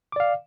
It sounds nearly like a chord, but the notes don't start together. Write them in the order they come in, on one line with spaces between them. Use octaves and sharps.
D6 D5 F5